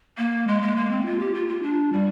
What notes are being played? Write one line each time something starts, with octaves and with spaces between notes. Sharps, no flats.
A#3
G#3
G#3
A#3
C4
F4
G4
F4
F4
D4
G3